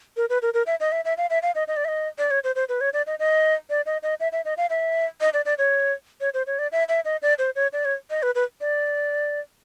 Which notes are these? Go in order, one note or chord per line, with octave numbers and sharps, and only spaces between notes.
A#4
B4
A#4
A#4
E5
D#5
E5
E5
F5
E5
F5
D#5
D#5
D5
E5
D#5
D5
C#5
C5
C5
B4
C#5
D5
D#5
D#5
D5
D#5
D#5
E5
E5
D#5
F5
E5
D#5
D5
D5
C#5
C#5
C5
C#5
D5
E5
E5
D#5
D5
C5
C#5
D5
C#5
D#5
B4
B4
D5